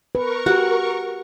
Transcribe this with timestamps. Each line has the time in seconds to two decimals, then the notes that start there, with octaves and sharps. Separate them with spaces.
0.15 A#4 B4 C#6
0.46 F#4 G4